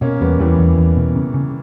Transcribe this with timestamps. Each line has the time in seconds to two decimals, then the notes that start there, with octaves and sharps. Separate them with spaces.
0.01 B2 A#3 C#4
0.21 E2 G3 B3
0.39 E2 E3 G3
0.59 E2
0.78 E2
0.97 B2
1.15 C#3
1.34 C#3